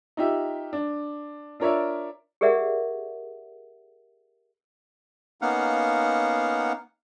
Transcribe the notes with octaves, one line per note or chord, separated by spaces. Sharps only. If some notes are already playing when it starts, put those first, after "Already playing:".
D#4 F4 G4 E5
D4
D4 F4 A#4 C#5 D5 E5
G4 G#4 A#4 D5 E5 F#5
A#3 B3 C#4 D#4 F5 F#5